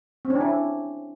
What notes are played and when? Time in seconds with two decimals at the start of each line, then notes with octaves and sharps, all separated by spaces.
0.25 C4
0.30 C#4
0.35 D4
0.41 E4